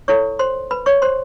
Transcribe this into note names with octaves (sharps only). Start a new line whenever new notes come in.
E4 A4 C#5 C#6
C5 C6
B4 B5
C#5 C#6
C5 C6